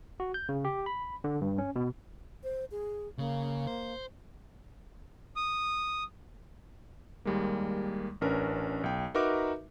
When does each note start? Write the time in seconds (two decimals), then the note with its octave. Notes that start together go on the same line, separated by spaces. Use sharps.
0.20 F#4
0.34 G6
0.49 C#3
0.65 G4
0.86 B5
1.24 D3
1.41 G2
1.58 C#4
1.76 B2
2.44 C5
2.71 G#4
3.18 C#3 A#3
3.67 C5
5.36 D#6
7.25 D#2 G3 G#3 A#3
8.21 A1 C#4 D4 A#4 B4
8.84 B1 G5
9.15 D#4 F#4 A#4 B4 E5 D6